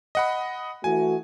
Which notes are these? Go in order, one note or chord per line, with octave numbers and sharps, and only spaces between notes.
D#5 F#5 B5
E3 A3 F#4 G#5